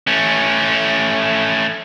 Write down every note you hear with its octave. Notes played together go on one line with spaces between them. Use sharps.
A3 C#4